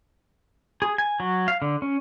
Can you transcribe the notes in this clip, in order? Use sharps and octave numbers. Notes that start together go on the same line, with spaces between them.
G#4
G#5
F#3
F5
D3
C#4